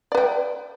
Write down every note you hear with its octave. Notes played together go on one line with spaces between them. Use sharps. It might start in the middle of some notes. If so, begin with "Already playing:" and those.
B4 D5 G5